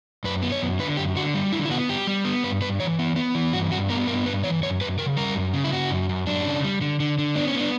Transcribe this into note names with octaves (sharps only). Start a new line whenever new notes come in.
F#2 B4
B3
C#5
F#2
D3 B4
F#2 G4
D3 F#4
G3
D3 E4
E4
B3 F#4
G3 G4
G3
B3
G2 B4
G2 B4
E3 C#5
B3
B3
E3
G2 F#4
G2 F#4
B3 A#4
G2 A#4
G2 B4
E3 C#5
F#2 C#5
F#2 B4
C#3 A#4
G3 A#4
F#2
C#3
E4
C#3 F#4
F#2
F#2
F#2 D4
C#3
G3
D3
D3
D3
B3 D4
C#4
B3 D4